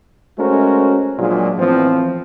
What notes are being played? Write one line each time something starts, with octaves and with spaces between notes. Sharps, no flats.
G#3 A3 C#4 F#4 A#4 C5
A#2 F3 F#3 G#3 A#3 D4
A2 E3 F3 B3 C4